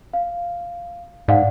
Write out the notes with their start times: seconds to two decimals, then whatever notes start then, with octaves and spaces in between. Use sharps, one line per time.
0.13 F5
1.28 G#2 D5 F5 F#5